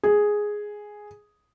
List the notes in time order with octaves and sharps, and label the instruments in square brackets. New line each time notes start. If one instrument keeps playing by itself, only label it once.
[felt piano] G#4